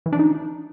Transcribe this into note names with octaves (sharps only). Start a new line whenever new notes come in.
E3
D4
D#4